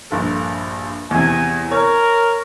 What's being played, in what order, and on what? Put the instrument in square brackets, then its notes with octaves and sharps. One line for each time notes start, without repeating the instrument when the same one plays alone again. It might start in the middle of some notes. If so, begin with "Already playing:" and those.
[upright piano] A#1 G2 A4
[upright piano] E2 C3 [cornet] G#5
[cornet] A#4 [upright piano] C#5